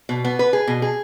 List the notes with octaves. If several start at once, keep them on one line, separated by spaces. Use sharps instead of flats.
B2
B3
B4
G#4
B2
G#4